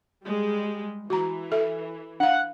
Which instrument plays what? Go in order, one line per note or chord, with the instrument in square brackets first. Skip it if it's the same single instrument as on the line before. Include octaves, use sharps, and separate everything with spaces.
[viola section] G3 G#3
[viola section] E3 [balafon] F#4 A#5
[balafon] A4 E5
[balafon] D4 F5 [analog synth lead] F#5